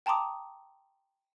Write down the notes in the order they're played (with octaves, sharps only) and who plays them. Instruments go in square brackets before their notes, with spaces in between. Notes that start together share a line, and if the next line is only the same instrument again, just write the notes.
[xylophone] G5 A5 A#5 C6 D6 D#6